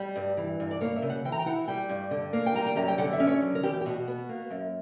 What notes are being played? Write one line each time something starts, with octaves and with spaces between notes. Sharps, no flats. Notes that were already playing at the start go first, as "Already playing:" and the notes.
Already playing: G3
G2
E3
G2
D5
A#3 C#5
E5
C#3
F#5
E3 G5
A#5
G5
E4 F#5
G3 G5
G2
D3
A#3
G5
G3 A#5
G5
F#2 A#5
G5
D3 F#5
E5
C#4
C#5
F#3
A#4
E2 G4
G4
B2 F#4
B3
A#3
F#2